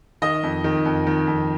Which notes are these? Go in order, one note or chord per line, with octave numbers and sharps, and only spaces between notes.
D#3 D#5
F2
D#3
F2
D#3
F2